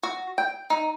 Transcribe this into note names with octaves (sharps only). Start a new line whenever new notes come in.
F#4
G5
D#4